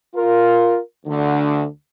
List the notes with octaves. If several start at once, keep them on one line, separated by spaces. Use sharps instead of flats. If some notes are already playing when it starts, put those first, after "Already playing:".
F4 A#4
D2 D3